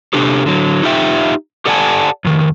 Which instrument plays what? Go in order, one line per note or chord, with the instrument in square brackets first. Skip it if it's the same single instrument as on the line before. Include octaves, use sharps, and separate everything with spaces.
[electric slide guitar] C3 D4 G4 A4
D3 F#3
D#4 F4 G4 E5 G5
G4 A4 D5 F#5 G#5 A5
F2 D#3